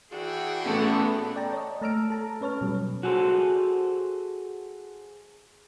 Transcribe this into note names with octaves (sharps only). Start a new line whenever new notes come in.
E3 D4 F#4 G#4 G5
A3 B3 C#4 A4
D5 G5 A5 A#5
C#5 D#5
A3 A5 A#5 E6 F6 D7
A4 A5 A#5
C#4 B4 C#5 A5 F6
B2 F#3 G3
F#4 G#4 A4 C5